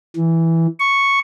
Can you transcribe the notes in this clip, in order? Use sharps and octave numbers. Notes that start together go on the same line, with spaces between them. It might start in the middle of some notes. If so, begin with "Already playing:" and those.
E3
C#6